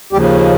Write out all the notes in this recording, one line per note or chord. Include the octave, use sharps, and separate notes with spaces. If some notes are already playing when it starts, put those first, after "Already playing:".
D#2 C#3 F3 G3 G4